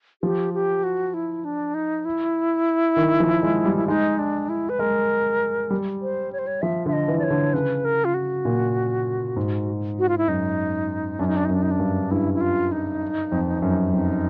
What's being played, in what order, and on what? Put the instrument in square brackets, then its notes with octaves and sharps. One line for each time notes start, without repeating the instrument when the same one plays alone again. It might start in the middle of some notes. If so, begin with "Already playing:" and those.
[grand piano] F3 [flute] G4
[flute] G4
F#4
E4
D4
D#4
E4
[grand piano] D#3
F3
G#3
G3
[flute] E4
[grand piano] G#3 [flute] D#4
[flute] D4
E4
B4
[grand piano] G#3 [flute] A#4
[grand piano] G3
[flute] C5
C#5
C5
C#5
[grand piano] F3 [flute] E5
[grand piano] D3 [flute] E5
[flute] D#5
[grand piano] E3
[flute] D5
C#5
[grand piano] D3
[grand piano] C#3 [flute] B4
[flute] A#4
F4
F#4
[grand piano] A#2
G#2
[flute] F#4
F4
E4
[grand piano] F#2 [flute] D#4
[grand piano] F#2 [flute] D4
[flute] D#4
D4
D#4
[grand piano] F#2 [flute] D4
[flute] D#4
D4
[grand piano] G2
[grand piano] G2 [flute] E4
[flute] E4
F4
D#4
[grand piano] F2
F#2
[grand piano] F2 [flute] D#4